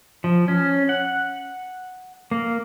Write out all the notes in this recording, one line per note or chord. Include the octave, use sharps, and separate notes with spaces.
F3
C#4
F#5
A#3